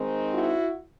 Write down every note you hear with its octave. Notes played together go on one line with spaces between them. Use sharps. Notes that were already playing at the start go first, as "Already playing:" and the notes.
Already playing: D#3 G#3 C4 D#4
E4 F#4